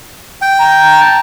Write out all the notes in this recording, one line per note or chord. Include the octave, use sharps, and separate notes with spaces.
G5
A#5
A5